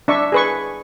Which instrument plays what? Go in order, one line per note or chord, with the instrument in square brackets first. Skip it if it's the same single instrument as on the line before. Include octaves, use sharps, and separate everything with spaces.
[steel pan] D4 E5 C#6
G#4 B4 C#6